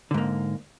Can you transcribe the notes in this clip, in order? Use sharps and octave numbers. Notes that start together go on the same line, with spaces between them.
G#2 D3 A#3